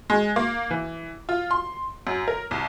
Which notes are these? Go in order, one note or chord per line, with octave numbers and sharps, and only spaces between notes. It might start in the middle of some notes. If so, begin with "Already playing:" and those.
G#3
A#3
E3
F4
C6
F#2
A#4
C2